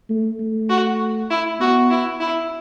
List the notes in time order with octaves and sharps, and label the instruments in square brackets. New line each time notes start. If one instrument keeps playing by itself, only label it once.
[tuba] A3
A3
[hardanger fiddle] F#4
E4
[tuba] B3 [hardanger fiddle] F#4
[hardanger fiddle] E4
E4